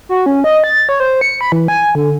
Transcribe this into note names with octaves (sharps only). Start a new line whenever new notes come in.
F#4
C#4
D#5
A6
C#5
C5
C#7
B5
E3
G#5
D3